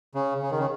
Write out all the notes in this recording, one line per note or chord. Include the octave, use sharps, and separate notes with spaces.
C#3
C#3
D#3
C#3